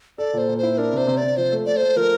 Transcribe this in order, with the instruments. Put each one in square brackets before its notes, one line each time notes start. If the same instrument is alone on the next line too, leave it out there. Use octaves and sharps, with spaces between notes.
[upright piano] A4 [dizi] D5
[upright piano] A#2 [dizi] C5
[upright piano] A#2
[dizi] C5
[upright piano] E4
[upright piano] D4 [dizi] A#4
[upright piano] C3 [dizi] C5
[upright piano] C3
[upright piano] C3 [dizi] D5
[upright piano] F3 [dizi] C5
[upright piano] A3
[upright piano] A3 [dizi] D5
[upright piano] A3 [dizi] C5
[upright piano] F3 [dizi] A#4